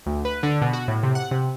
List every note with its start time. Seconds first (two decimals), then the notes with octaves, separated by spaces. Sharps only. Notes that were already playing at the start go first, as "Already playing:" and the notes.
0.06 D2
0.25 B4
0.43 D3
0.62 B2
0.73 F#4
0.88 A2
1.03 C3
1.15 F#5
1.31 C3